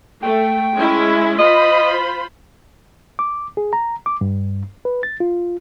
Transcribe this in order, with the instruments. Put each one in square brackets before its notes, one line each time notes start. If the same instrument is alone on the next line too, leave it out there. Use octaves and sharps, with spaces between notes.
[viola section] A3 [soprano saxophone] G5
[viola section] G#3 C#4 E4
[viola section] F4 C5 B5 [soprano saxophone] D#5
[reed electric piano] D6
G#4
A#5
D6
G2
B4
A6
F4